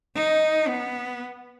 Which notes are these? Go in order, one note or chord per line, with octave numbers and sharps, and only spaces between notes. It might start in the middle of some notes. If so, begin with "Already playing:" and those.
D#4
B3